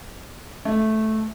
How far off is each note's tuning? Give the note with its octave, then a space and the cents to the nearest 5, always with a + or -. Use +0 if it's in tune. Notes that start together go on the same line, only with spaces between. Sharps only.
A3 -10